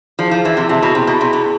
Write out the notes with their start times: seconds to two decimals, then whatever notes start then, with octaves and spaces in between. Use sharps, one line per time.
0.19 F3 E4 G#4 D5 A5
0.31 F3
0.45 E3
0.57 C3
0.69 C3 E4 G#4 D5 A5
0.82 B2
0.95 C3
1.07 B2
1.21 C3 E4 G#4 D5 A5
1.33 B2